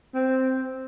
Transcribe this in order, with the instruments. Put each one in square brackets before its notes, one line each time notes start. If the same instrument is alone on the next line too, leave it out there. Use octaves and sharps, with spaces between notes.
[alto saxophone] C4